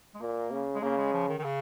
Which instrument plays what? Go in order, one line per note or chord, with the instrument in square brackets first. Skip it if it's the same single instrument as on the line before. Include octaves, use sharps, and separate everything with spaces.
[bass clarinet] G#3
[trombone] A#2 [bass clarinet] A#3
[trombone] C#3
[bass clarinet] G#3
[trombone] C#3 [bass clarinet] A#3
[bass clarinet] G#3
F3
D#3
D#3
C#3